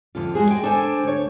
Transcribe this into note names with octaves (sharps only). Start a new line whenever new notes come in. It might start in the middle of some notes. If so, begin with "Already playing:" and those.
F2 D3 F4
G#3 F#4 G#4
D#5 G5
D4 A4 C5 G#5
D2 C#5